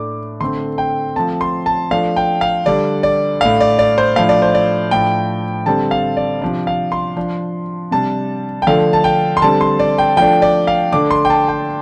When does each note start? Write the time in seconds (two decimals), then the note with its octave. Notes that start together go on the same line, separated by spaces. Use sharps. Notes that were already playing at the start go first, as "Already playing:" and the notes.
Already playing: A2 A3 D4 D6
0.41 D3 A3 C4 C6
0.78 G5
1.16 F3 A3 C4 A5
1.41 C6
1.66 A5
1.91 F3 A3 D4 F5
2.16 G5
2.41 F5
2.66 D3 G3 D4 D5
3.03 D5
3.41 A2 A3 D4 F5
3.60 D5
3.79 D5
3.98 C5
4.16 A2 F3 D4 F5
4.29 D5
4.42 C5
4.55 D5
4.91 A2 F3 D4 G5
5.66 D3 G3 C4 A5
5.91 F5
6.17 D5
6.41 C3 F3 D4 D5
6.67 F5
6.92 C6
7.17 F3 D4
7.91 C3 G3 D4 A5
8.62 G5
8.67 D3 F3 A3 D4 F5
8.93 A5
9.04 G5
9.37 C6
9.42 D3 G3 C4 A5
9.61 C6
9.79 D5
9.98 G5
10.17 F3 A3 D4 G5
10.42 D5
10.67 F5
10.92 D3 A3 D4 D6
11.11 C6
11.25 G5
11.30 A5
11.48 G5